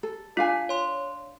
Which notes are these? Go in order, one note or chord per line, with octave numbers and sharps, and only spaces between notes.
A4
D4 F4 F5 G#5
C#5 C6